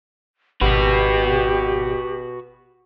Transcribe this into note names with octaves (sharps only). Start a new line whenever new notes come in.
G#1 F#4 G4 B4